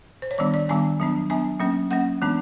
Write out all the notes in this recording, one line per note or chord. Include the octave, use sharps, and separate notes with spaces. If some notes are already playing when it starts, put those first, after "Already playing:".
C5
C#5
D#3 G3 B3 D4 D5
D5
D#3 G3 B3 D4 G#5
F#3 B3 D4
F#3 B3 D4 G#5
F#3 A#3 C#4
F#3 A#3 C#4 F#5
E3 G#3 B3 D4